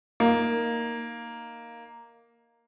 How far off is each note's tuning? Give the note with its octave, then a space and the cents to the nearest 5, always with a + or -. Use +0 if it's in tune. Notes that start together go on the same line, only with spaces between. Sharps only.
A#3 +0 D#4 +0